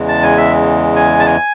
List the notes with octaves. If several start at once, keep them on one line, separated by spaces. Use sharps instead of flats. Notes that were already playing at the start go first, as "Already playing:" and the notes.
Already playing: E2 C#3 E3 G#3
A5
G#5
E5
G#5
A5
G#5